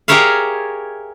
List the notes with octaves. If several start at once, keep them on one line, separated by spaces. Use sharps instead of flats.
G4 G#4 A#4 C#5 E5 F5